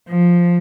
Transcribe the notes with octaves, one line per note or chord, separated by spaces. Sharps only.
F3